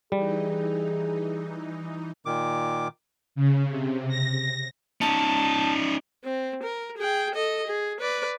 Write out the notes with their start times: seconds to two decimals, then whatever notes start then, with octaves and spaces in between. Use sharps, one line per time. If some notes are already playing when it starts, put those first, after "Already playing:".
0.12 E3 G3 D#4 G#4
2.26 A#2 D#3 D6
3.35 C#3
3.68 C3
4.08 A#6
5.01 C#4 D#4 A5
6.24 C4
6.63 A#4
6.97 G#4 G5
7.34 A4 D#5
7.67 G#4
8.00 B4 D5